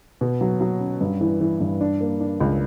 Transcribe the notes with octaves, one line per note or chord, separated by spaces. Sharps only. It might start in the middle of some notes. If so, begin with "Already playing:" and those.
B2
F#3
F#3
C#4
G2
E3
E3
G2
D4
A#3
D4
C#2